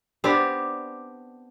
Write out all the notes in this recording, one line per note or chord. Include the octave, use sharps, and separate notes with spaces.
B3 C4 D4 G4